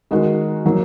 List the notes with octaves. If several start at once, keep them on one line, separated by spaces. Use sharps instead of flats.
D#3 G#3 F#4 A#4
F#3 A#3